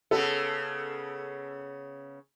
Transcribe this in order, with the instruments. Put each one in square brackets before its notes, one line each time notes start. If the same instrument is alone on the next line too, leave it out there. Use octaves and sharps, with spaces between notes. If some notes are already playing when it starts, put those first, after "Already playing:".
[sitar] C#3 B3 [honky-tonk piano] A4